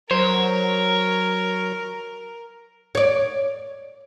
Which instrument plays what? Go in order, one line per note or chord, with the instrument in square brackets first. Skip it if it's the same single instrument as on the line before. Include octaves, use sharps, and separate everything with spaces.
[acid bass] F#3 [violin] A#4 [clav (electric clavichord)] C5 [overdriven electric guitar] C#5
[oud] C#5 D5